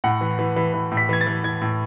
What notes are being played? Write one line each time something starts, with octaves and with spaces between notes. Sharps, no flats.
A2 F#5
E3
E3
E3
E3
A2
B6
E3 G#6
A6
E3
E3 G#6
A2